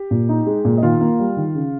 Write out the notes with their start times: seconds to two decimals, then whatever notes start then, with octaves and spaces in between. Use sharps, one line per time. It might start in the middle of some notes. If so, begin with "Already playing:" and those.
Already playing: G4
0.11 A#2
0.29 D#4
0.46 G#3
0.65 A#2
0.77 D#5
0.83 D#3 F4 F5
1.01 A#3
1.19 G3
1.37 D#3
1.55 C#3